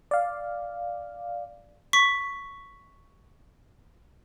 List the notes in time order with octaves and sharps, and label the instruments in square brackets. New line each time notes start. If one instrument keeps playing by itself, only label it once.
[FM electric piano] D5 F5
[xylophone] C#6 B6